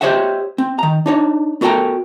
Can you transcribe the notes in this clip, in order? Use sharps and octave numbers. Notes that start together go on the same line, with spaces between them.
G4 C5 C#5 D#5 E5 F#5
C4
D#3 A#5
D4 D#4 C#5
B3 F#4 A4 A#4 G5 A#5